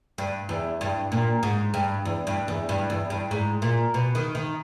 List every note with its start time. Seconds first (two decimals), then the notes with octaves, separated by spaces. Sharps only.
0.18 G2
0.49 E2
0.81 G2
1.12 A#2
1.43 G#2
1.74 G2
2.05 E2
2.27 G2
2.48 E2
2.69 G2
2.90 E2
3.10 G2
3.31 G#2
3.62 A#2
3.94 B2
4.15 D#3
4.35 D#3